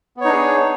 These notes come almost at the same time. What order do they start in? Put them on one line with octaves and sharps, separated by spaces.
B3 C#5 D#4 D4 G#4